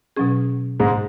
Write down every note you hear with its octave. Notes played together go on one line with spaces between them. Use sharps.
B2 F#3 C#4 G#4
G#2 G#3